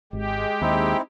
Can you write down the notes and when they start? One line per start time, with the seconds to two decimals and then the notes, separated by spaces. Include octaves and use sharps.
0.13 G#1 G#3 G4
0.61 D#2 C4 D#4 E4